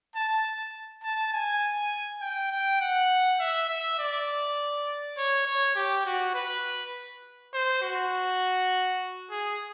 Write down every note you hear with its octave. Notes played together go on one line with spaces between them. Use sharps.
A5
A5
G#5
G5
G5
F#5
E5
E5
D5
C#5
C#5
G4
F#4
B4
C5
F#4
G#4